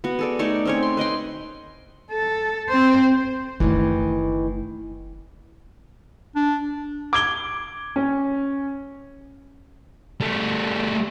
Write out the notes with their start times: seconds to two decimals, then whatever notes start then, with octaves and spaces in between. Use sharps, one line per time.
0.04 B3 F#4
0.19 G#4 A4 D5
0.39 A3 D#4 C#5 D5
0.65 C4 C#4 C#5
0.83 C6
0.97 B4 D#5 G5 C6
2.11 A4
2.69 C4 C5
3.60 F#1 D#3 E3 A3
6.36 D4
7.13 D6 G#6 G7
7.96 C#4
10.21 G3 A3